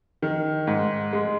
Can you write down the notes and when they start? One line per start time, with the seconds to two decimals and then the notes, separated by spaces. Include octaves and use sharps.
0.22 D#3
0.67 G#2
1.13 G#3